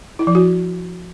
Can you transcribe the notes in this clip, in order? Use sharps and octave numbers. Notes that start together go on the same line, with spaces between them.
E4
F3
F#4